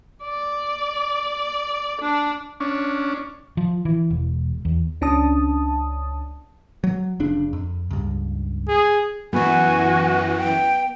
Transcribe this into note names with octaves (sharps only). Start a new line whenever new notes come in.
D5
D4
C#4 D4
F3
E3
E1
E2
C#2 C#4 D4 A5 D#6
F#3
F1 C#3 D4
F2
C#2 G2
G#4
F#2 E3 B3 F#4 G#5
G5